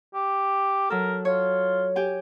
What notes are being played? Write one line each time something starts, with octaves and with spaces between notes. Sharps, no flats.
G4
F#3 A4 A#4
F4 C#5
G4 G5 G#5